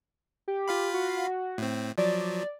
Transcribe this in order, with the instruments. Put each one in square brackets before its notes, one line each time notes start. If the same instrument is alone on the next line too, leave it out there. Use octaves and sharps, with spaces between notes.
[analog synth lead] G4
[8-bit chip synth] F4 F5 B5
[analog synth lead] F#4
[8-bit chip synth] A2 C4
[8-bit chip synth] F3 F#3 [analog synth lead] D5